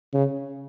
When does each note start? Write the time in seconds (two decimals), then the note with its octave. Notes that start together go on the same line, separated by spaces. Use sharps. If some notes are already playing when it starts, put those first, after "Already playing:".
0.14 C#3